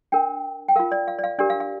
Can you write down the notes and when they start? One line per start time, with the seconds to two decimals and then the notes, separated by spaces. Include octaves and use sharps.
0.12 D4 A#4 G5
0.68 G5
0.76 F4 A#4 F5
0.92 D5
1.08 F5
1.19 D5
1.24 F5
1.39 D4 G4 A#4 D5
1.50 F5
1.60 F5